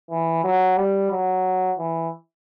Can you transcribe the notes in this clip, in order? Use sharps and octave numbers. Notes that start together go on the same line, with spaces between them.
E3
F#3
G3
F#3
E3